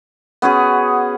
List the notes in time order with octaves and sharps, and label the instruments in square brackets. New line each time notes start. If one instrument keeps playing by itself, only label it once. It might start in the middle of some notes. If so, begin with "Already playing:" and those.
[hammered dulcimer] B3 C#4 F#4 G#4